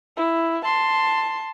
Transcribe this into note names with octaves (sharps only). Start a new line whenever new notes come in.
E4
A5 C6